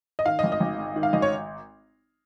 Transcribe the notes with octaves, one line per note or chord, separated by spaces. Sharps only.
D#5
D#3 F5
D#5
G#1
D#5
G#1
G#2
D#3
F5
G#1 D#5
C#5